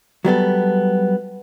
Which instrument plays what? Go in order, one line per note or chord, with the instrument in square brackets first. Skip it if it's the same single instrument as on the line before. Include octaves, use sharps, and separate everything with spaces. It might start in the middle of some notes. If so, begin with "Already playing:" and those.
[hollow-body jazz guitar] F#3 G3 B3 A4